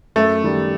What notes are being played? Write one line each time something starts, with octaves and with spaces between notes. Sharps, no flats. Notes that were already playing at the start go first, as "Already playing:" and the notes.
F#2 A3
D#3 G3